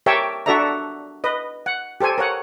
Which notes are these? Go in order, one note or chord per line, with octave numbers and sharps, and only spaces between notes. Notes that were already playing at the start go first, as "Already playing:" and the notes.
G4 A#4 C#5 E5 G5 A5
D4 F#4 A4 D5 E5 A#5
B4 D#5
F#5
G4 A4 C5 G#5
A#4 C#5 F#5